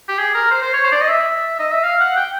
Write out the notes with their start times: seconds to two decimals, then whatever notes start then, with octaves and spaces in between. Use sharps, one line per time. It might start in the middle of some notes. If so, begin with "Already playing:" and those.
0.08 G4
0.19 G#4
0.34 A#4
0.51 C5
0.62 C5
0.73 C#5
0.84 C5
0.92 D5
1.01 D#5
1.09 E5
1.59 D#5
1.71 E5
1.84 F5
2.01 F#5
2.16 G5